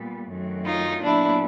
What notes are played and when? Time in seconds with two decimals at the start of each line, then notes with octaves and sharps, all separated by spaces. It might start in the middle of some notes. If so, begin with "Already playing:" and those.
Already playing: A#2 G3 B3
0.29 F#2 D#3 F#3 A3 C4
0.65 D#4 F4
1.02 A#2 F#3 B3 D4 E4